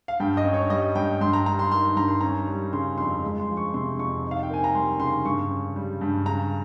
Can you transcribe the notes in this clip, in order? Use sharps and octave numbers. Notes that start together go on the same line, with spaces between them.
F5
G2 G5
D#5
C#4
C#5
G3 D#5
G2 G5
G2 C6
A#5
G3 A#5
C6
D#3 C6
G2 A#5
C6
C#4 A#5
G3
C#3 C6
F2 C6
G#3
C6
F3
C#6
C3 C6
F2 C#6
D#4
F5
G5
A#3 G#5
A#5
G3 C6
C#3 C6
G2 C#6
C#4
G3
G2
C#3 A#5